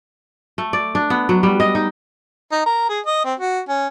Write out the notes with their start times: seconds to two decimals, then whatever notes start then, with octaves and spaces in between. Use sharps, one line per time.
0.58 A3
0.73 D5
0.95 D4
1.10 B3
1.29 F#3
1.43 G3
1.60 D#5
1.75 D#4
2.52 D#4
2.66 A#4
2.89 G#4
3.06 D#5
3.25 C4
3.40 F#4
3.69 C#4